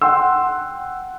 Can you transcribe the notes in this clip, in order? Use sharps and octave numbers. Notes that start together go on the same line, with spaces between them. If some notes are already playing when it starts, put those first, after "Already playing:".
F#5 G5 C6 E6